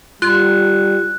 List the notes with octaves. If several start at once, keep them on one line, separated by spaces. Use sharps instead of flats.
G3 F4 F#6